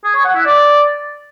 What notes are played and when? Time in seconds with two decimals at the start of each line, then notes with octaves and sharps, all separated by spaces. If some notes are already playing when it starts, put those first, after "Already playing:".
0.04 G#4
0.14 C#5
0.25 F#5
0.35 E4
0.45 D5